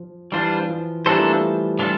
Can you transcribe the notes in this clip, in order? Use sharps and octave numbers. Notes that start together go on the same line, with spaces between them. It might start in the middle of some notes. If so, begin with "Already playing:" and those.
Already playing: F3
E3 G3 D4 F4 C5
F3
E3 G3 A#3 D4 A4 C5
F3 A3
E3 G3 D4 F4 A4